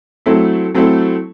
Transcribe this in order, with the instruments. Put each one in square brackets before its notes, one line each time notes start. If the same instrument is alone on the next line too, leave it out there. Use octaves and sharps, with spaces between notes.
[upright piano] F#3 A3 C4 E4 A4
F#3 A3 C4 E4 A4